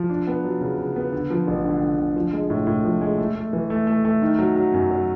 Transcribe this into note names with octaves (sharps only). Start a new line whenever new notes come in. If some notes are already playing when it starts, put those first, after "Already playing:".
Already playing: F3
D4
B3
F#3
C#3
C#3
B3
D3
F3
A1
D3
D3
D3
F3
G#3
A2
A2
F3
G#3
A3
A3
E3
A3
A3
A3
D#3
F#3
F#3
F#2
F#3